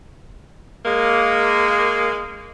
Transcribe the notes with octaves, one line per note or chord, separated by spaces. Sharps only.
G#3 A#3